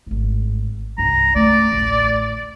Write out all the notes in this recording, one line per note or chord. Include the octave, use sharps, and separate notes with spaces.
G#1 A2
C2 G2 A#5
A3 C#4 D5
A1 D2